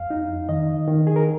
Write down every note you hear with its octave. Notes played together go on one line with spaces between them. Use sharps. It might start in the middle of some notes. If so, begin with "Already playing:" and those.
Already playing: F2 F5
D#4
D#3 D#5
D#3
G#4
A#4